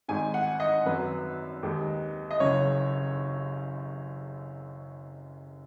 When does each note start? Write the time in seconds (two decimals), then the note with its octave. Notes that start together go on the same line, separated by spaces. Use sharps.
0.08 G#1 G#2 G#3 G#5
0.34 F#5
0.60 D#5
0.86 G#1 F#2 F#3 B4
1.63 D#2 D#3 G#3
2.31 D#5
2.40 F#1 F#2 C#3 C#5